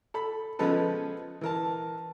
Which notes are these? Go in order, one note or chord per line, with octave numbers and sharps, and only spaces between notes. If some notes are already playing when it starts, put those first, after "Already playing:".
A4 B5
C#3 F3 G#3 B3 A4 B4
E3 A#4 A5